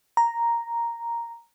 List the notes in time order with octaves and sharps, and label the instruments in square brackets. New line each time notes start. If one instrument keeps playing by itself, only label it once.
[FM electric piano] A#5